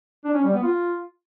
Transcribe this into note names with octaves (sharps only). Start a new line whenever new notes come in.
D4
C#4
G3
B3
F4